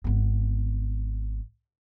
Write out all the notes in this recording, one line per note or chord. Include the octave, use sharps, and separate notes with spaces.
G#1 B3